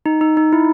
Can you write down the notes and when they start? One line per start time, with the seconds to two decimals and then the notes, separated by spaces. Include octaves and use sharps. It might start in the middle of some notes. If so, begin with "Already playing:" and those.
0.06 D#4
0.21 D#4
0.37 D#4
0.53 E4